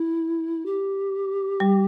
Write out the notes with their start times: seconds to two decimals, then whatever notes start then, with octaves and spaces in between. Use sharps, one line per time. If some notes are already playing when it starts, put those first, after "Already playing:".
Already playing: E4
0.66 G4
1.60 G3